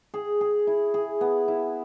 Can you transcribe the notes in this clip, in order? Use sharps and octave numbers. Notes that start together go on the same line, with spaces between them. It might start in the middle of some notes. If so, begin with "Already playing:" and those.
G#4
G#4
E4
G#4
B3
E4